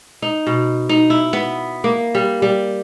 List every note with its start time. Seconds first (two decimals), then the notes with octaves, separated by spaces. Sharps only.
0.22 D#4
0.47 B2
0.89 D#4
1.10 E4
1.33 B3
1.84 A#3
2.15 G3
2.42 G3